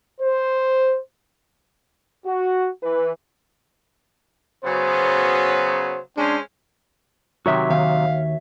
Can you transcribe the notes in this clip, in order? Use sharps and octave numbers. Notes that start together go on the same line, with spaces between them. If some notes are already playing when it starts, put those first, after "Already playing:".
C5
F#4
E3 B4
C#3 F#3 B3 C5
G#3 C#4 D4 C5
C3 D#3 F#3 F#4 C#5 E5
D#2 F5